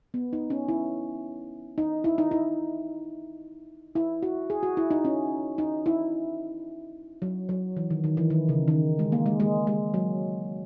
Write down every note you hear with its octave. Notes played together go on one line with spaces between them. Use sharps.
B3
D#4
C#4
E4
D#4
E4
D#4
E4
E4
F#4
G#4
F#4
E4
D#4
C#4
D#4
E4
F#3
F#3
E3
D#3
D#3
E3
D#3
C#3
D#3
G#3
A#3
G#3
G#3
G#3
F#3